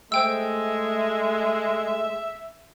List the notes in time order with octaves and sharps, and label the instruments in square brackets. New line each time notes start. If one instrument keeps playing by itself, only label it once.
[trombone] G#3 [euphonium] A3 [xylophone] C5 G5 E6 [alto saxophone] E5